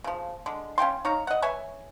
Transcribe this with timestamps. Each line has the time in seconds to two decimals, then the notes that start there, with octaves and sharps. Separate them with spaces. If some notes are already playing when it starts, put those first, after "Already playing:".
0.04 C#3 F3
0.46 D3 G#3
0.78 C#4 F5 G5 C6
1.05 D#4 C#5 F5 A#5
1.27 D#5 F#5
1.42 B4 C#5 E5 G#5